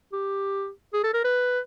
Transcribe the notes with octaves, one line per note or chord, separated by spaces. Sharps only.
G4
G#4
A4
A#4
B4